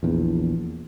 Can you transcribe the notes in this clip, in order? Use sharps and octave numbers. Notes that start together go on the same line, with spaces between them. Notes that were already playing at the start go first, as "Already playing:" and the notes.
A#1 E2